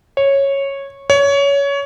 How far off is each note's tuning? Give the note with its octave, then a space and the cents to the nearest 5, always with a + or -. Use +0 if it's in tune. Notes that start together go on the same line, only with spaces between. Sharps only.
C#5 -10
C#5 +20